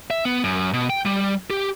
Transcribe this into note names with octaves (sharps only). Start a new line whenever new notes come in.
E5
B3
F#2
B2
G5
G3
G4